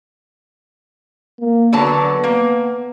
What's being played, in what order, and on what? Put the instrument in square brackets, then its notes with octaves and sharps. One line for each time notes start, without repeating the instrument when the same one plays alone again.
[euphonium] A#3
[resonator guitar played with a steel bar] D3 F#3 A5 [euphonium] B3
[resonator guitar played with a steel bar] A#3